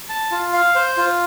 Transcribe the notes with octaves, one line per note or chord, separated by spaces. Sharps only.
A5
F4
F5
C5
F4